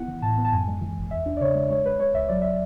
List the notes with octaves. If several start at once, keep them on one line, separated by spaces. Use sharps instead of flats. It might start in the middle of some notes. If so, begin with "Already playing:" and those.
Already playing: B3 E4 F#5
E3
A2 A5
B3
A5
F#2 G#5
G#3
E3
G#1
E2 E5
D4
D5
C#3 C#5
G#3
G#3 C#5
G#3 B4
G#3 C#5
C#2 E5
F#3 D5
E5